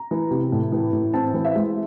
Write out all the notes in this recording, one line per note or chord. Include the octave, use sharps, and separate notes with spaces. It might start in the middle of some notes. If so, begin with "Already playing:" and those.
Already playing: A#5
E3
C3
A2
E3
A2
C4 A5
E3
E5
G#3